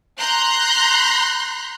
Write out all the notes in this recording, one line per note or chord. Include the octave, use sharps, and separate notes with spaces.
A#5 C6 F#6 G6